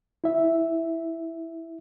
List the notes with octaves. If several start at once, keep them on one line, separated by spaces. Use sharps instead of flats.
E4 E5